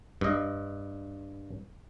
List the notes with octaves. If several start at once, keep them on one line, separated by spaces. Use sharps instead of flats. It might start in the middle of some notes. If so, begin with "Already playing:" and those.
G2 D#5